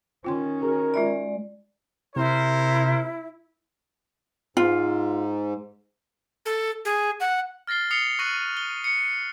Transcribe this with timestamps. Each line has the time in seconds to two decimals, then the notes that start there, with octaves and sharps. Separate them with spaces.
0.25 D#3 C#4 F4 G5 C6
0.62 F#4 G#4 A#4
0.94 G#3 F4 D5 E5 B5
2.16 C3 E4 A#4 C5
4.57 G#2 F4
6.46 A4
6.85 G#4
7.20 F#5
7.67 F6 A6 A#6 C7 G7
7.91 D#6 C7 C#7 F7 G7
8.19 C#6 F#6 A#6 D#7 F#7
8.57 G7
8.84 C#7